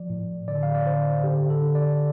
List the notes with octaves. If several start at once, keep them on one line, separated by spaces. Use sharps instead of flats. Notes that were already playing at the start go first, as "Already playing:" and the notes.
Already playing: F3 D5
A2
D3 D5
F5
D5
D3 C5
D3 G4
A4
D3
D5